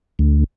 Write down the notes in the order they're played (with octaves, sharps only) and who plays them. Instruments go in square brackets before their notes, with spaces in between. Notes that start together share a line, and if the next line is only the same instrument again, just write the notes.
[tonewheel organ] D2